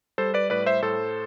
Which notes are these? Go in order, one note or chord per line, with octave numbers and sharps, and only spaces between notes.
G3 A4 C5
B4 D5
A2 B4 D5
C5 E5
A2 A4 C5